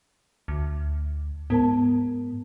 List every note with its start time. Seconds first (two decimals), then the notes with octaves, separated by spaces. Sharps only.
0.48 D2
1.50 G#2 B3 A#4 A5